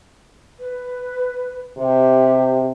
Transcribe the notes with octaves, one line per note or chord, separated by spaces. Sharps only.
B4
C3 G4